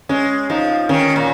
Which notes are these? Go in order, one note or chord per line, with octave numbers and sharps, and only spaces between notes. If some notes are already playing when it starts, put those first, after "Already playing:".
G#3 C#4
F3 D#4
D#3 C#4
A#2